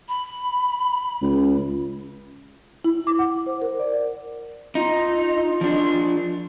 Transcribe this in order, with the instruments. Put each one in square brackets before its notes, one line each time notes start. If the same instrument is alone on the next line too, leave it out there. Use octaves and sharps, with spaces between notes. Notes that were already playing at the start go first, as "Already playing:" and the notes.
[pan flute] B5
[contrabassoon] C#2
[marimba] E4
D6
F#5
C5
A#4
D5
[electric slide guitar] D#4 [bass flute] F4
[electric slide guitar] F3 D4